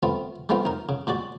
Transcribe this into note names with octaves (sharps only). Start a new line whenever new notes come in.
A3 B3 C4 F4
G#3 A3 B3 C4 F4
D#4 A#4
C#3
A#2 G#3 F#4 D5